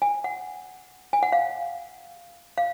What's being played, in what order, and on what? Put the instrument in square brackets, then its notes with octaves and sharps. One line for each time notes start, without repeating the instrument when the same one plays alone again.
[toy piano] G#5
F#5
G#5
F#5
F5
F5